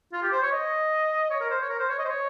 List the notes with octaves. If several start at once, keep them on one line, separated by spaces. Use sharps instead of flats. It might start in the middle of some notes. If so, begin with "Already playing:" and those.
F4
G4
C5
C#5
D#5
C#5
A#4
C5
C#5
A#4
C5
C#5
D#5
C5
C#5